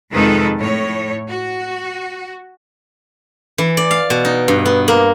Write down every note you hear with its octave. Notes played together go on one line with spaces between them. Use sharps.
F2 C3 D#3 G#3 A4 B4
A2 C#5
F#4
E3
D5
F5
B2
D#4
G2
B3
A#3